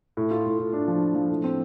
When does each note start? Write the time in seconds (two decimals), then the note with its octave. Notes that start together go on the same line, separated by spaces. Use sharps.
0.17 A2
0.31 F4
0.46 A2
0.59 A2
0.73 D4
0.88 F3
1.01 D4
1.15 F3
1.30 A2
1.44 C4